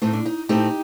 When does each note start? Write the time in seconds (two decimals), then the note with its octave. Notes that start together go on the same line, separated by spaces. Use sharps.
0.02 A2 A3 C4 D#4
0.13 D4
0.26 D#4
0.49 A2 A3 C4 D#4 G4